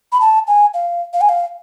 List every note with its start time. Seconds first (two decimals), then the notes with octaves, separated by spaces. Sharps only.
0.12 B5
0.21 A5
0.47 G#5
0.74 F5
1.13 F5
1.21 G#5
1.29 F5